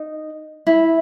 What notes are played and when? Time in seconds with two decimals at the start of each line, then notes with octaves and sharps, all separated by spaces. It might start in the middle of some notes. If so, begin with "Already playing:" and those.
Already playing: D#4
0.67 E4